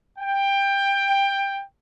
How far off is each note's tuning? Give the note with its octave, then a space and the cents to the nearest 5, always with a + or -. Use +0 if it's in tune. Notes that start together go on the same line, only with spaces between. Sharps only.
G5 +15